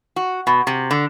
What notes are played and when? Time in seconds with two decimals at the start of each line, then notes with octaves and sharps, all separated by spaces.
0.16 F#4
0.47 B2
0.67 C3
0.91 D3